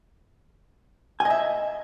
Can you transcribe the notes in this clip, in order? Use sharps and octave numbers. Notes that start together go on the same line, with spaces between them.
D#5 E5 G#5